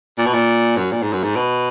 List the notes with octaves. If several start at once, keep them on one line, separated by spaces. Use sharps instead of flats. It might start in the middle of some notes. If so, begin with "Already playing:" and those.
A#2
B2
A#2
F#2
A#2
G#2
F#2
G#2
B2